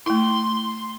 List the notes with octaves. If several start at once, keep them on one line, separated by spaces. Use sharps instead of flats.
A3 E4 C6